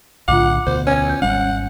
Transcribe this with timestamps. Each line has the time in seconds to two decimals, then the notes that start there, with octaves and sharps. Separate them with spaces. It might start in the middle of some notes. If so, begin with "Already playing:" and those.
0.28 B1 A2 D3 F4 F#5 D6
0.67 D2 B2 C5
0.87 C#4 G#6
1.09 G6
1.22 G#1 G3 C#4 F#5